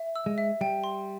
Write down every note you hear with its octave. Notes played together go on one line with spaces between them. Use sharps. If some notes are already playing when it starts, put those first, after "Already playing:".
Already playing: E5
E6
G#3
E5
G3 G5
C6